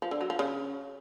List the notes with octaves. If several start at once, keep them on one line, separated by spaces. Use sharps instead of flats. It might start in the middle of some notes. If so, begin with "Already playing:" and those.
F3
D3
F#3
F3
C#3